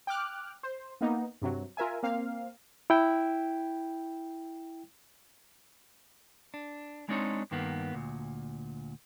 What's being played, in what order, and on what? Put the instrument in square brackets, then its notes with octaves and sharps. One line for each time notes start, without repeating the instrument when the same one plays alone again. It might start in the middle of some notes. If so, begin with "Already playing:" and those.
[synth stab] G5 D6 F6 F#6
C5
A#3 B3 D#4
G2 C3 F#3
F4 A#4 E5 G#5
A#3 C4 F5
[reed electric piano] E4 G5
[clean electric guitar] D4
G#3 C4 D4 D#4 C#5
G2 D#3 A#3 B3
D2 A#2